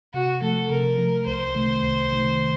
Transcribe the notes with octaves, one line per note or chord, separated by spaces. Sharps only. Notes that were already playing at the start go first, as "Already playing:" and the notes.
C3 F#4
F3 A3 A4
C3 A#4
F3 A3
C2 C5
C3 D#3 A3
C2
C3 D#3 A3